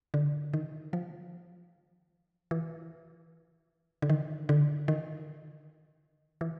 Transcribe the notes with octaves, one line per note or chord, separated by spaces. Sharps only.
D3
D#3
F3
E3
D3
D#3
D3
D#3
E3